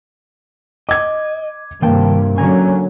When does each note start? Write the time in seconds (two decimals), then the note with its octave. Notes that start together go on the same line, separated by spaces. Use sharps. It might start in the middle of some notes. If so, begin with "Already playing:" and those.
0.89 D#5 D6 G#6
1.82 G2 C3 D#3 A#3 G5 A5
2.38 D3 F#3 C#4 G#5 A#5